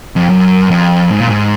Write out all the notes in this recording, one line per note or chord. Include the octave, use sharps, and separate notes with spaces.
F2
F#2
F2
G#2
A#2
G#2